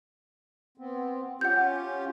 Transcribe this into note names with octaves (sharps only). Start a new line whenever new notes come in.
B3 C4
C#4 F4 G4 F#5 G6